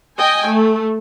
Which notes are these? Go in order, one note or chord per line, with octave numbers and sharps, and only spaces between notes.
D#5 G5 G#5
A3